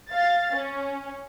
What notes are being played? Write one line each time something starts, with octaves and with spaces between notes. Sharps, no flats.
F5 A6
C#4